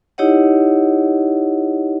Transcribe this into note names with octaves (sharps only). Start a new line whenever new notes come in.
D#4 E4 G4 C#5 D#5 F#5